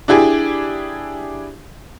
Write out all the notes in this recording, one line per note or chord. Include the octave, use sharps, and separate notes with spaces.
D4 E4 G4 G#4